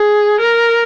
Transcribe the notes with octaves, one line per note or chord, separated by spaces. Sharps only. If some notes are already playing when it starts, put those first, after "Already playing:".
Already playing: G#4
A#4